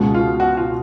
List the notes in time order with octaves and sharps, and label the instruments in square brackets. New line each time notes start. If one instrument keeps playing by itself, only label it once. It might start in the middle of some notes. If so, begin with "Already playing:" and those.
Already playing: [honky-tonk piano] C#2 B2 G#3
[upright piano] F4
F#4
F4